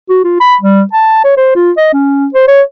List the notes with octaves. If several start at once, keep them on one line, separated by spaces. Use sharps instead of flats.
F#4
F4
B5
G3
A5
C#5
C5
F4
D#5
C#4
C5
C#5